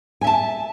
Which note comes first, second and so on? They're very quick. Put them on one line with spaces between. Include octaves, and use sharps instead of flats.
G#5 E5 A5